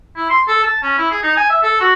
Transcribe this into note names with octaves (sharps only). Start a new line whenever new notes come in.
E4
C6
A4
A5
C#4
E4
G#4
D#4
G#5
E5
A4
F#4